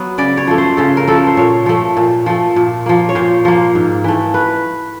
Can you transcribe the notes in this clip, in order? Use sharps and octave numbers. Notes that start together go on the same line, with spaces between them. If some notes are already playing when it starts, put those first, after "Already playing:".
Already playing: F#3 B3
C#3 D5
C#5
F3 A3
C5
C#3 A4
A#4
F3 A3 A4
C5
A#2 C#5
F3 A3
A#2
F3 A3
A#2
F3 A#3
C#5
A#2 C5
F3 A#3
G#2
E3 A3
B4